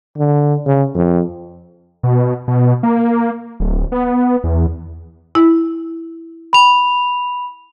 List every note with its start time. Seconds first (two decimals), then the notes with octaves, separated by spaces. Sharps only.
0.18 D3
0.66 C#3
0.95 F2
2.03 B2
2.48 B2
2.83 A#3
3.60 D1
3.92 B3
4.44 E2
5.35 E4
6.53 B5 F7